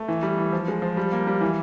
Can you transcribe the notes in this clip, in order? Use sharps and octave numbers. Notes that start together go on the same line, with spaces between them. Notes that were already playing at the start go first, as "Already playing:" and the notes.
Already playing: A3
E3
G3
E3
F3
G#3
F3
G3
A#3
G3
E3